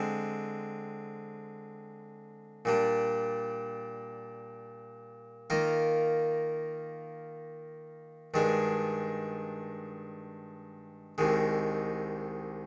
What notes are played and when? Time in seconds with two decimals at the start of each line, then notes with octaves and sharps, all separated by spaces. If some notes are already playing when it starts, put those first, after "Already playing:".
Already playing: D3 G#3 C4
2.65 A#2 G3 D4
5.50 D#3 A#3 F4 A#4
8.34 G2 D#3 G#3 D4 G#4
11.18 C2 C3 D#3 G#3